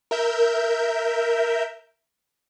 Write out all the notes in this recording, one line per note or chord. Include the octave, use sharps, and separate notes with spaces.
A#4 E5 G6